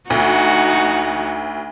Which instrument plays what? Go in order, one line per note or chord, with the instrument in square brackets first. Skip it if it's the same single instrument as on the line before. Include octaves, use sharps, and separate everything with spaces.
[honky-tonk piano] D2 [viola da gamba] D#4 F#4